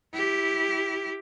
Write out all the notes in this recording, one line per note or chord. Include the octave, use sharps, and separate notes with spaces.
E4 G4